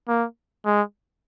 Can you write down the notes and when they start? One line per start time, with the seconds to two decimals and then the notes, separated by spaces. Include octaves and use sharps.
0.08 A#3
0.65 G#3